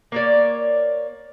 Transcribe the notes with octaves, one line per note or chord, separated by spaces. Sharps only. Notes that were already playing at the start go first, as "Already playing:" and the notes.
A#3 C#5 D5